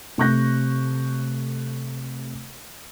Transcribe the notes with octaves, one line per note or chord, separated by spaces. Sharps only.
C3 A3 C#6 F#6 G6 A#6